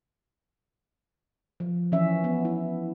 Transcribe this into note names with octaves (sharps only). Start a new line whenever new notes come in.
F3
E3 F3 C#4 E5
B3
E4